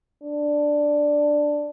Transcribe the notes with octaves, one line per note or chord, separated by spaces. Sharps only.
D4